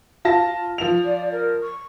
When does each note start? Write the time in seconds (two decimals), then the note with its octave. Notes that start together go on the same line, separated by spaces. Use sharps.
0.25 F4 A5 A#6
0.78 F3 F7
1.05 D5
1.31 A#4
1.63 C#6